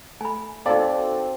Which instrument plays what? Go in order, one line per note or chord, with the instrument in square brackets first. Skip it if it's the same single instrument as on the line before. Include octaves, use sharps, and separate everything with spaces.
[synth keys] A3 [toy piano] G#5 B5
[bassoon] C4 [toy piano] D#4 F5 [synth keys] F#4 A4 [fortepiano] D5